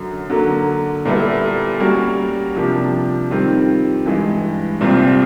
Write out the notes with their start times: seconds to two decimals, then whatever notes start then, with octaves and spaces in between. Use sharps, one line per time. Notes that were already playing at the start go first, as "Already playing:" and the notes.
Already playing: F#2 D3 F#3
0.30 D3 F#3 A#3
1.05 A#2 G3 B3 E4 A4
1.80 G3 A#3 C#4 F#4 A#4
2.56 C3 F3 A#3 D4 G4
3.31 D#3 G3 C4 F4
4.06 G2 E3 G#3
4.81 C2 A#2 G3 C4 F4